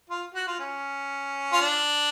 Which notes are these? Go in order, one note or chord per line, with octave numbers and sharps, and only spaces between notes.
F4
F#4
F4
C#4
F4
D4